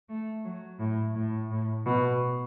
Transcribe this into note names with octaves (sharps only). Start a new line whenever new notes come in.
A3
F#3
A2
A2
A2
B2